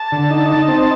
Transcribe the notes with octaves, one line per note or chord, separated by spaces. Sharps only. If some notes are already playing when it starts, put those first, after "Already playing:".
Already playing: A5
D3
D#4
D#4
C4